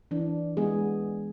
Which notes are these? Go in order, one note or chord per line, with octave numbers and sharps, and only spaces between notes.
E3 D4
G#3 B3 G#4